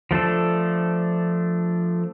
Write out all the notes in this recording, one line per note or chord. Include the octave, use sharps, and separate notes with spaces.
F3 A3 D4 A4